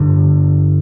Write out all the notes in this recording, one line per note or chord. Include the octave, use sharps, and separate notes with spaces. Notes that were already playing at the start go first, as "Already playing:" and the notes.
Already playing: G2 D3